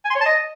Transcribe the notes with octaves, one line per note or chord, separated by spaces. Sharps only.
G#5
C6
C#5
A5
D#5